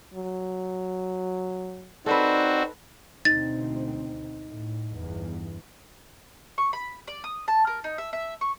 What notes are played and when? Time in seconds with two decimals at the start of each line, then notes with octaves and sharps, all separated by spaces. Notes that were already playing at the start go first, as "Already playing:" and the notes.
0.14 F#3
2.06 C4 D#4 F#4 A4 B4 D5
3.25 D2 B2 C4 D#4 A6
4.47 A2
4.94 G1 E2
6.58 C#6
6.73 B5
7.08 D5
7.24 D#6
7.48 A5
7.67 A#4
7.84 D#4
7.98 E5
8.13 E5
8.41 C#6